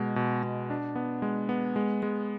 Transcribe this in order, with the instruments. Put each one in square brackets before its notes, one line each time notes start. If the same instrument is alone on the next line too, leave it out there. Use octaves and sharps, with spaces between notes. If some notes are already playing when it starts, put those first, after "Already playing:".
Already playing: [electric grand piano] B2 G#3
B2
B2
D4
B3
G#3
B3
G#3
G#3